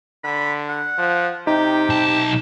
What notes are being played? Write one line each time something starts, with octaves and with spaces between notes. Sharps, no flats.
D3 B5
F#5
F3
C3 D#4 G4
B1 A5